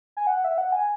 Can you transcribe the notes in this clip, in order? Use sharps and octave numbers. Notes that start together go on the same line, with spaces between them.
G#5
F#5
E5
F#5
G#5